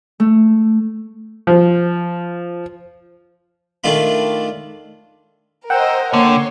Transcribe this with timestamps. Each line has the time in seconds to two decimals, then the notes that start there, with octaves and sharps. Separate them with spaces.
0.20 A3
1.47 F3
3.84 D#3 A3 D4 F4 B5
5.70 A#4 C5 D#5 F#5 G5 E6
6.13 D3 A#3 C#5 C6